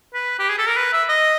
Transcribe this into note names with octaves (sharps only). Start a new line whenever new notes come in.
B4
G4
G#4
A4
A#4
B4
E5
D#5